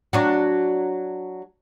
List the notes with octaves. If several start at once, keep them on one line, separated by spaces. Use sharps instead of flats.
F#3 D4 F#4